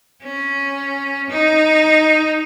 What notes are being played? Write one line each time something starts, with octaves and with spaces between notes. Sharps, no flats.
C#4
D#4